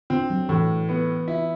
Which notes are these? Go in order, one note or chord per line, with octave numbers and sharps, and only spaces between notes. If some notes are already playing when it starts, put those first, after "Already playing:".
D3 C4
F#3
A2 E3
B3
E4